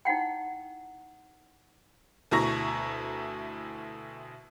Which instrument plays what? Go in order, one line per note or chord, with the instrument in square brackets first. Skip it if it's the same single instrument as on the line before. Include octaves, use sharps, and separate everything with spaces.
[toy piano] D#4 E4 F#5 G5
[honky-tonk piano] D2 B2 E4 A#5 C#6 A#6